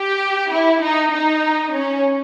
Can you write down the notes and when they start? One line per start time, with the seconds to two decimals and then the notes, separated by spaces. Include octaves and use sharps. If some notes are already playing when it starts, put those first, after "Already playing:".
Already playing: G4
0.52 E4
0.83 D#4
1.12 D#4
1.73 C#4